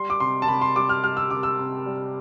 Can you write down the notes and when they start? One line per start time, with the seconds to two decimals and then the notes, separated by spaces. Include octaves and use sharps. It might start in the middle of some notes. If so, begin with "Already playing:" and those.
Already playing: G3 C6
0.10 D6
0.20 C3 C6
0.42 A5
0.48 C3 B5
0.61 C6
0.76 G3 D6
0.89 F6
1.03 G3 F6
1.17 E6
1.30 C3 D6
1.43 E6
1.59 C3
1.86 G3